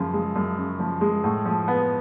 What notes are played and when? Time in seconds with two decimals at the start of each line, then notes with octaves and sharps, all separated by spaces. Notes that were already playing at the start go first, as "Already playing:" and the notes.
Already playing: F#2 C#3 F3
0.14 G#3
0.36 F#2
0.58 C#3
0.80 F3
1.01 G#3
1.24 A2
1.45 F3
1.68 B3